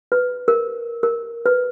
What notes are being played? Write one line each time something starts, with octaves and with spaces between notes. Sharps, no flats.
B4
A#4
A#4
B4